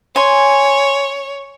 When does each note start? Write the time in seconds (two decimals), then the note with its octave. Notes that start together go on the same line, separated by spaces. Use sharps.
0.16 C#5 G#5 C6